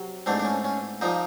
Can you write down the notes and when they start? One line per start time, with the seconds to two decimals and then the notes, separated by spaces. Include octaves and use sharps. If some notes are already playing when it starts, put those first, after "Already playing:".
Already playing: C3 F#3
0.26 G#2 E3 A3 C4 D4
0.40 D4
0.45 C#4
0.64 C#4
1.01 A#2 F3 A#3 D#4